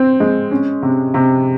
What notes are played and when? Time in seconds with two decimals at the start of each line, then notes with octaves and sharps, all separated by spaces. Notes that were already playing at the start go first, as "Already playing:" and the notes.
Already playing: C4
0.20 G#3
0.51 C#4
0.83 C3
1.14 C3